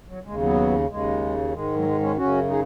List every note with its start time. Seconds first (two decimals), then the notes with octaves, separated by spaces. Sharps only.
0.08 F#3
0.24 D#2 C#3 G#3
0.40 F#3 B3
0.89 D#2 C#3 G#3
1.53 G#2 D#3 G#3
1.76 F#3
1.85 G#3
2.01 G#3 C#4
2.17 F#2 C#3 C#4 F#4
2.49 D#4 G#4